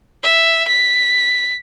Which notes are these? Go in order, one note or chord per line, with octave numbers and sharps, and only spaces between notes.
E5
B6